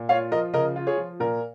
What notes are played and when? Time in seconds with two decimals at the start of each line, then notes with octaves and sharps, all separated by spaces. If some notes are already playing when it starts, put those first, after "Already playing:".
Already playing: A#2
0.09 F4 C#5 F5
0.32 F3 A#4 D#5
0.53 C#3 A#4 D#5
0.76 F4
0.87 G#4 C#5
0.97 F3
1.20 A#2 A#4